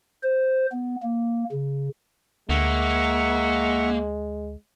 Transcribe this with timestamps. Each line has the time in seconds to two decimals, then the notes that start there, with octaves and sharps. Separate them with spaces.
0.23 C5
0.72 B3
1.03 A#3
1.52 C#3
2.49 D2 G#3 A#3 E5 F#5 C#6